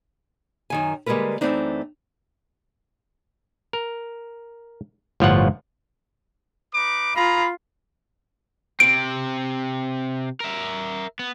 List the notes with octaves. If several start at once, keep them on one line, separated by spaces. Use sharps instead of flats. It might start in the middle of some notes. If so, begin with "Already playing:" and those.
F#2 D#3 G#5
D3 G3 G#3 A#3 A#4 B4
F#2 E3 A3 C4 D4 D#4
A#4
G1 A2 F3 F4 C#5 F#5
D#4 B4 D6
F4 G#4 A#4 A#5 B5
C3 C4 D7
A#4 E5
B3